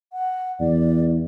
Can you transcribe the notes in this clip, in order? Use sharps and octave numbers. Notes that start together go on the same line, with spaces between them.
F#5
E2 D5